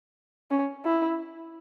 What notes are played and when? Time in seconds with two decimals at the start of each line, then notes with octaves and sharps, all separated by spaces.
0.51 C#4
0.85 E4